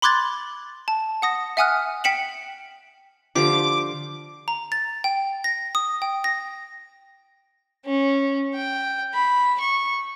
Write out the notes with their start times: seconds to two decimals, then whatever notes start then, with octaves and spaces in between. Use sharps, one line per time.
0.02 B5 C6 D6 F#6 G#6 A6
0.88 A5
1.22 F#5 D#6 A#6
1.57 E5 F#5 G#5 D#6 F6 F#6
2.04 G5 B6 C#7 E7 F#7
3.35 D3 F3 G4 D6
4.48 A#5
4.72 A6
5.04 G5
5.44 A#6
5.75 D#6
6.02 G5
6.24 A#6
7.86 C#4
8.54 G5
9.14 B5
9.60 C#6